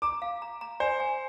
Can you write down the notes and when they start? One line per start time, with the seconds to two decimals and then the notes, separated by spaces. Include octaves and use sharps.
0.02 A#5 D6
0.22 F5
0.42 A#5
0.61 A#5
0.80 C5 G#5
1.00 G#5